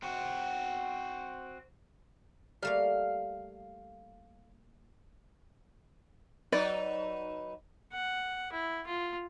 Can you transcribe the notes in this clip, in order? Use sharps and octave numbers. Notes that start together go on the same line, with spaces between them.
C4 F#4
G3 A3 A#3 F5
F#3 D#4 B4 D5
F#5
E4
F4